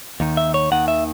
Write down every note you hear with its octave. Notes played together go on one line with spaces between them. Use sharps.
D#2 D#3
E5
C#5
D#2 D#3 F#5
E5